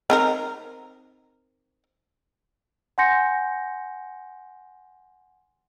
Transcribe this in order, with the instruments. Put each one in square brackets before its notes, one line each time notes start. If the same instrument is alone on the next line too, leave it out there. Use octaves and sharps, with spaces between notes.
[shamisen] C4 D#4 A#4
[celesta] F#5 G#5 C6 G6 A#6 C#7